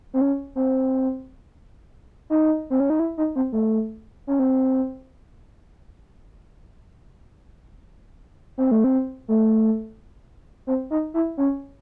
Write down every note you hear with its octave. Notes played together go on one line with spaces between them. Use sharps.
C4
C#4
C4
D#4
C4
C#4
D#4
E4
D#4
C4
A3
C#4
C4
C4
A3
C4
A3
C4
D#4
E4
C#4